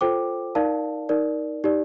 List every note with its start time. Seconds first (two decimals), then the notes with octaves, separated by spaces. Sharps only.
0.01 F4 A4 C5 G5 D6
0.55 D#4 A#4 D5 F5 A5
1.09 D#4 A#4 D5
1.64 D#4 G4 D5